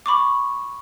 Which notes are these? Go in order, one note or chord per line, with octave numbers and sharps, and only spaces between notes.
B5 C#6 D6